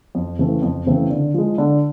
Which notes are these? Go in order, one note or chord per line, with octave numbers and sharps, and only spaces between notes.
F2
C#3 E3 A3 C4
F2
C#3 E3 A3 C4
D3
F3 G#3
D3